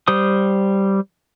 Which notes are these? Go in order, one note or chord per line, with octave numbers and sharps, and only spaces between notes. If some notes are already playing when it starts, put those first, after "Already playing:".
G3 C5 D#6